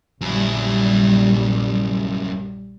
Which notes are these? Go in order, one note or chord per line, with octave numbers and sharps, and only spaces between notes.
A#1 F#2 G3 E4